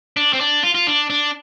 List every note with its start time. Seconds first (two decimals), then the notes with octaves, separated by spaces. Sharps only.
0.17 D4
0.33 C4
0.40 D4
0.63 F4
0.75 F4
0.87 D4
1.10 D4